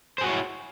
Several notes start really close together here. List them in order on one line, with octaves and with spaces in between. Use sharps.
C5 G#4 F#4 C#5 E4